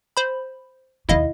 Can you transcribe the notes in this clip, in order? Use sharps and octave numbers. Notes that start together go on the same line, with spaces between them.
C5 B5
D#2 C3 E4 D#5 F5